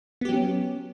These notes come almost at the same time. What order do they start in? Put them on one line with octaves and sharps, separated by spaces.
B3 G4 F#3 C#4